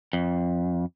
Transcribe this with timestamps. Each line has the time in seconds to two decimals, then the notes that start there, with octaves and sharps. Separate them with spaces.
0.13 F2